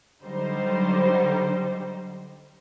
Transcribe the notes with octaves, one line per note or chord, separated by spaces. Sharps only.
D3 F#3 G3 D#4 C5